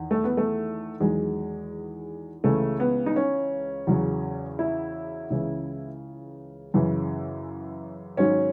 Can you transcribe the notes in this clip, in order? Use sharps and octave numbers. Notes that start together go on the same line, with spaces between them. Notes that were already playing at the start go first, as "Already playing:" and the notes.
Already playing: E2 D#3
A3
B3
A3
E2 D#3 F#3 G#3
C#2 C#3 E3 A3
B3
D#4
C#4
E2 C#3 F#3
E4
C#2 C#3 E3
F#2 C#3 E3
G#2 D#3 F#3 C#4